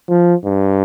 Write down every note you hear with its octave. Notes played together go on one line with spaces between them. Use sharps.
F3
G2